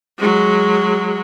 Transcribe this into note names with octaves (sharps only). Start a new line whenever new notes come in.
F#3 G#3